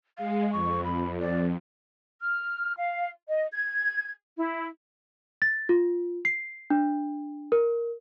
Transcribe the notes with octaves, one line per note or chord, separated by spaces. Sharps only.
G#3 F5
F2 C#6
B5
D5
F6
F5
D#5
G#6
E4
A6
F4
C7
D4
A#4